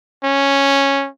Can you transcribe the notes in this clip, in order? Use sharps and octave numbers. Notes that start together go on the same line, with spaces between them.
C#4